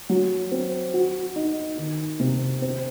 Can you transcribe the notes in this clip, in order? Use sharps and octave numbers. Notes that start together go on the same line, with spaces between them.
F#3
C4
F#4
D#4
D#3
C3
C4